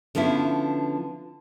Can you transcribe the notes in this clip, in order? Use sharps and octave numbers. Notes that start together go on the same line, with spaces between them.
D3 F3 B3 C#4 E4